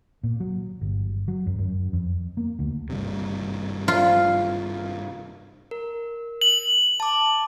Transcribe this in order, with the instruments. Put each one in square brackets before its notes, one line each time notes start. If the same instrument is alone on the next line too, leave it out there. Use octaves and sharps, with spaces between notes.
[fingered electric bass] A#2
F#3
G1
F#3
F#2
F#2
F2
A#3
D2
G#1 G2 C3
[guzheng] F4
[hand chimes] A#4
[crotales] F#7
[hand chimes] A5 D6